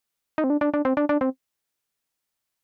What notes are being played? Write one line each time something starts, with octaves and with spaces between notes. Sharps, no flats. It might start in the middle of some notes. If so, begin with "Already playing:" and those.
D#4
C4
D4
D4
D4
C4
D4
D4
C4